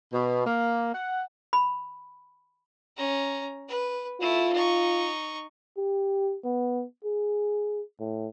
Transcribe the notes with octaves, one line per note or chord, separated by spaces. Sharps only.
B2
A#3
F#5
B5
C#4 A#5
B4
A3 E4 F4
D#4 C#6
G4
B3
G#4
A2